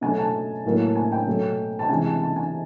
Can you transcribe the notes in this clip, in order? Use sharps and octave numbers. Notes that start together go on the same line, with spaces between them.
B2 F#3 A3 G#5
A5
A2 F#3 A#3
G#5
G5
B2 F#3 A3
A5
C3 E3 G#3 G#5
A5
A5
G#5